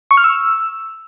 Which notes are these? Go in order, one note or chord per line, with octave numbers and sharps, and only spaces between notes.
C#6
F6
E6